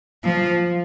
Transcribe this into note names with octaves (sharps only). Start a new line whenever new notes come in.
F3